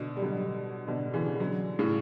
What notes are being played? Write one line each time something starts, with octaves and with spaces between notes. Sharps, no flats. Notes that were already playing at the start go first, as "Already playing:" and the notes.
Already playing: B2 D3
G3
D3 F#3
B2 D3
C#3 E3
D3 F#3
A2 C#3